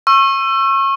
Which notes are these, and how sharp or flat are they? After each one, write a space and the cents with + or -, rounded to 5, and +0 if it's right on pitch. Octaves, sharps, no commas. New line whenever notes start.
C#6 -30 E6 +30